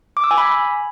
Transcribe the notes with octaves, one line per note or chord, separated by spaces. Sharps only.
D6
E6
G#5
B5